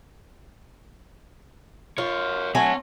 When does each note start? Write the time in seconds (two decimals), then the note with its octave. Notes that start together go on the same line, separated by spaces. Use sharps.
1.98 F4 A#4 C#5
2.55 F#3 A3 C4 C#5 G#5